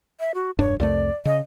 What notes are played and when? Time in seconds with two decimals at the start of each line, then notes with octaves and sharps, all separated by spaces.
0.20 E5
0.34 F#4
0.59 E1 G2 D4 C#5
0.80 C2 F2 A3 D5
1.25 C#3 D#5